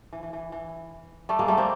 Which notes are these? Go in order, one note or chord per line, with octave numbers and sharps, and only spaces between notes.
E3
E3
E3
E3
G3 A3
G#3 A#3
G3 A3
A#3 C4